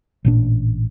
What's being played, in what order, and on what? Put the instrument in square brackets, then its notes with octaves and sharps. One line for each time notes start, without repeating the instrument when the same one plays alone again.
[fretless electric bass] A1 A#2 D4